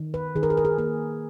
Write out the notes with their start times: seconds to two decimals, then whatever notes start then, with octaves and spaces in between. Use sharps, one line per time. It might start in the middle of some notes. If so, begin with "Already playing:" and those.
Already playing: D#3
0.14 B4
0.36 D#3 G#4
0.43 A#4
0.50 G#4
0.57 A#4
0.65 G#4
0.78 A#3 G#4